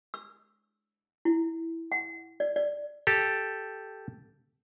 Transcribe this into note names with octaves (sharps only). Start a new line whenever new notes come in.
E6
E4
F#5
D5
D5
G4 A4